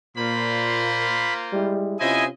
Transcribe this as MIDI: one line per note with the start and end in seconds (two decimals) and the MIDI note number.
0.16 1.31 46
0.16 1.81 58
0.16 1.81 65
0.16 1.81 72
0.16 1.33 83
1.52 1.97 55
1.52 1.97 56
1.52 1.97 64
1.99 2.29 48
1.99 2.29 61
1.99 2.24 64
1.99 2.29 65
1.99 2.25 72
1.99 2.24 75
1.99 2.25 80